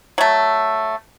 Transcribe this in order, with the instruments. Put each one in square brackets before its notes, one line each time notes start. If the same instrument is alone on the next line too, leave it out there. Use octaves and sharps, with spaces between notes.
[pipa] F#3 A3